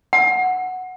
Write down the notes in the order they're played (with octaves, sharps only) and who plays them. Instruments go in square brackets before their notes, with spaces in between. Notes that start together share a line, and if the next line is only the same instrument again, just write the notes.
[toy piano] F#5